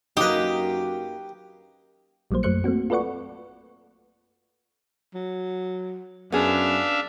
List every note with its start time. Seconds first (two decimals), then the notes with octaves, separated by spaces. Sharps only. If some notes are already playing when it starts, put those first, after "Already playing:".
0.17 F#2 A#3 D#4 G4 B4 D#6
2.31 A#1 F#3 G3 A#3 C5
2.43 F#2 F#3 A3 C5 F#6 C#7
2.64 A3 A#3 C4 F#4
2.90 F4 A4 B4 D5 F#5 C#6
5.14 F#3
6.32 F#2 B3 D4 G#4 E5 F5